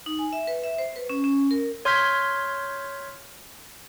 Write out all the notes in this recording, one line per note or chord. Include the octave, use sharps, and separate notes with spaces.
D#4
G#5
E5
B4
E5
C5
B4
C#4
C#4
A#4
C#5 C6 F6 G6 G#6 B6